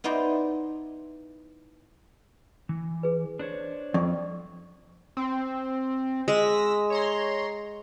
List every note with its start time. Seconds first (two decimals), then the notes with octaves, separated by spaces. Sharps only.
0.04 B3 D#4 E4 C5 D5 D#5
2.69 E3
3.03 G#4 B4
3.39 D4 C5 C#5
3.94 F2 D5 C#6
5.17 C4
6.28 G#3 E6 A#6 B6
6.90 C#5 A#5 C6